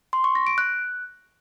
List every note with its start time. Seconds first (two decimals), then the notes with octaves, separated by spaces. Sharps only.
0.13 C6
0.24 C#6
0.35 A#6
0.47 D7
0.58 F#6